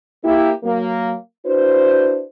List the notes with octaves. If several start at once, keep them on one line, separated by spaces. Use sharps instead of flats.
A#3 E4 G4
F#3 A#3
D4 E4 F#4 B4 C5